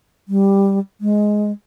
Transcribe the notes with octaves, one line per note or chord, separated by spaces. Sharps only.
G3
G#3